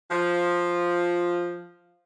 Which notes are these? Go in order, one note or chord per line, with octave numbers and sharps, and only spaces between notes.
F3